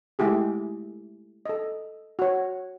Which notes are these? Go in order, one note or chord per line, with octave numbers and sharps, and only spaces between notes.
G#3 A3 E4 G4 G#4
A4 D#5
F#4 C#5